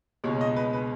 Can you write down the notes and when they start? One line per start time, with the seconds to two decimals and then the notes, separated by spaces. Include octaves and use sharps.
0.24 C#2 B2 G#3 C#5
0.41 D#5
0.56 B4
0.73 B4